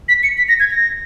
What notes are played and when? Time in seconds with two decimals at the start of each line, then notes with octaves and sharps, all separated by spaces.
0.09 B6
0.23 C#7
0.38 B6
0.48 A#6
0.60 G#6
0.71 A#6